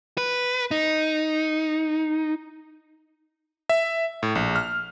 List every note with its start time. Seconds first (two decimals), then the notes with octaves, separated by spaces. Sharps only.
0.18 B4
0.71 D#4
3.70 E5
4.23 A2
4.35 A#1
4.56 F6